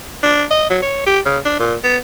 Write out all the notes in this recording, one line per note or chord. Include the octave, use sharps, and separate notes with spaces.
D4
D#5
F#3
C#5
G4
C#3
D4
A#2
B3